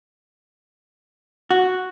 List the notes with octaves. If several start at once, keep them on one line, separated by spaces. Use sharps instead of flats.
F#4